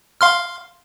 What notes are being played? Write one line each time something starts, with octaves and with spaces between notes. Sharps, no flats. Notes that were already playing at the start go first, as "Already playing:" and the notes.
F5 C6 F6